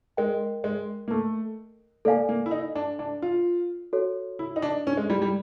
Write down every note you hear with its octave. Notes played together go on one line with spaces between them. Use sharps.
G#3 A#4 D#5 G5
G#3
A#3
A3
A#3 A4 D5 F5 G#5
A#3
E4
D#4
D4
D4
F4
F#4 A4 C#5
E4
D#4
D4
C#4
G#3
G3
G3